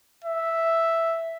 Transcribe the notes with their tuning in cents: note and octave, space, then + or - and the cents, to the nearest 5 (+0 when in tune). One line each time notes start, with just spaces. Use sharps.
E5 +0